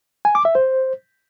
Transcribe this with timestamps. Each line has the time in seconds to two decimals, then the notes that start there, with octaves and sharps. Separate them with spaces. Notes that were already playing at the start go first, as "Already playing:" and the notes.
0.25 G#5
0.35 D6
0.45 E5
0.55 C5